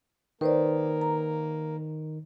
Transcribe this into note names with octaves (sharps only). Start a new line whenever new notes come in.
D#3 A#3 B4 C5 D5
A#5